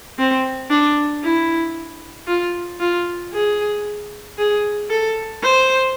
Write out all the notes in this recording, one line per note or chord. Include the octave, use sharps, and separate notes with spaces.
C4
D4
E4
F4
F4
G#4
G#4
A4
C5